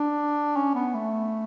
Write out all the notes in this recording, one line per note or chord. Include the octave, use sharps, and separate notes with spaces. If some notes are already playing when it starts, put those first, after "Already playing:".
Already playing: D4
C#4
B3
A3